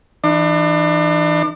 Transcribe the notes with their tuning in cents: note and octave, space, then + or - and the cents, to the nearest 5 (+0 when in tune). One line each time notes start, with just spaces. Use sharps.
E3 +0 D4 +40